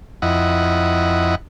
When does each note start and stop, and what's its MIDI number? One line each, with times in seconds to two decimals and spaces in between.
0.22 1.35 41
0.22 1.35 64
0.22 1.35 75
0.22 1.35 78